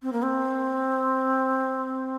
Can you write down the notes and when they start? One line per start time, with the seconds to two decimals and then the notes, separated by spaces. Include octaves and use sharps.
0.03 C4
0.13 A#3
0.22 C4